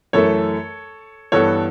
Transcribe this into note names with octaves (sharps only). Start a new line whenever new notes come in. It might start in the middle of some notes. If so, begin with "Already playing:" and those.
F#2 E3 A3 A4 C#5
G2 E3 B3 A4 C#5